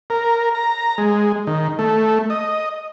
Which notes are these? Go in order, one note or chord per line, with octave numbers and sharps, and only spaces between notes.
A#4
A#5
G#3
D#3
A3
D#5